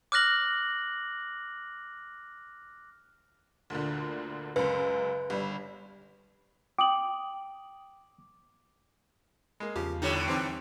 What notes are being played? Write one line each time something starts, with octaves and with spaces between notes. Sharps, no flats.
D6 F6 F#6 A#6 F#7
D2 A#2 D3
C#2 F#2 B4
G1 G3
G5 D6 D#6 F#7
G#3 A#3
E2 C#3 F3 G4
A2 D3 G3 D#4 C#5
E3 C4 D#4 C5 D6